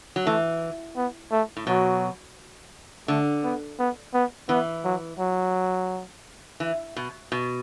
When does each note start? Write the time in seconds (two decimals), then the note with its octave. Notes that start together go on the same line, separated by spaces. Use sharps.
0.16 F#3
0.26 E3 A3
0.97 B3
1.31 A3
1.57 A2
1.67 B2 F#3
3.08 D3 A3
3.44 B3
3.79 B3
4.14 B3
4.49 E3 B3
4.84 F#3
5.19 F#3
6.60 E3
6.96 B2
7.32 B2